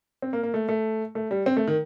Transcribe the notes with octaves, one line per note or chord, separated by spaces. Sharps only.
C4
A#3
A#3
A3
A3
A3
G3
C4
A3
D#3